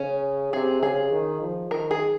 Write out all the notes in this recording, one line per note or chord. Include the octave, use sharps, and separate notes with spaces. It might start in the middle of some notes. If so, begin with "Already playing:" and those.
Already playing: C#3 C#4
C3 G#4
C#3 G#4
D#3
F3
D#3 A#4
G#4